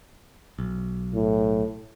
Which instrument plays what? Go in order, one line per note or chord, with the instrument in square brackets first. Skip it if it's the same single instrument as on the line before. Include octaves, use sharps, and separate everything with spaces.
[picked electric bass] B1
[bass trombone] A2